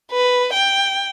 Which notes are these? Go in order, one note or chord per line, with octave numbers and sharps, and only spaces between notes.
B4
G5